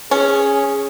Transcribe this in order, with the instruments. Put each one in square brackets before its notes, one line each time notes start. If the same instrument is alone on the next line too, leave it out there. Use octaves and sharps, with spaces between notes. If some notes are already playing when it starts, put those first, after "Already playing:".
[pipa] C#4 [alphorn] G#4